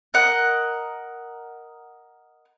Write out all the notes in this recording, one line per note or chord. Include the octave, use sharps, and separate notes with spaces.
A#4 D#5 F#5